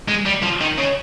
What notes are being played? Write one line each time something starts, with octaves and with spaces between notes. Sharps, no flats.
G#3
G3
F3
D#3
C#3